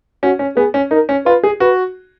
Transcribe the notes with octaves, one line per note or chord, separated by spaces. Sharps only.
C#4 F#4
C#4
B3 G#4
C#4
D#4 A#4
C#4
F4 B4
G#4
F#4 B4